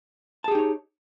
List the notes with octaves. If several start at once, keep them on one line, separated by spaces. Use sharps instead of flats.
D#4 G4 G#4 C#5 A5